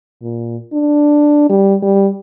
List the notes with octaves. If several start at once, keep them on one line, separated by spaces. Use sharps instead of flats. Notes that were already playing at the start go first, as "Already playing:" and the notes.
A#2
D4
G3
G3